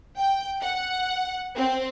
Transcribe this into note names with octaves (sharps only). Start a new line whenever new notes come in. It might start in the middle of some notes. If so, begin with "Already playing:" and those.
G5
F#5
C4